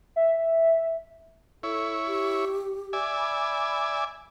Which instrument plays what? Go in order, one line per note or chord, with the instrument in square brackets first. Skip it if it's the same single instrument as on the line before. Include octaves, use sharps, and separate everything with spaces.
[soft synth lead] E5
[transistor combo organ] E4 C#5 [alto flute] A4
[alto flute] G4
[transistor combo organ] D5 E5 G#5
[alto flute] B5